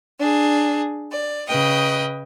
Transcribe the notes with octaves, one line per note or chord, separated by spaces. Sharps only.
D4 G#4
D5
C#3 B4 D#5 G5